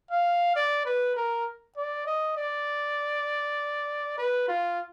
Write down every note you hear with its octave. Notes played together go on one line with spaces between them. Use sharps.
F5
D5
B4
A#4
D5
D#5
D5
B4
F4